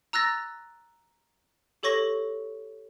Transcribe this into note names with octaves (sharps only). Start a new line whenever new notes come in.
A#5 E6 F#6 A6 A#6
G4 A4 C#5 C#6 A#6